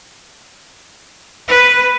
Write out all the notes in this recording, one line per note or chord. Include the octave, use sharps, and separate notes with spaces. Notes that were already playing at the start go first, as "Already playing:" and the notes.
B4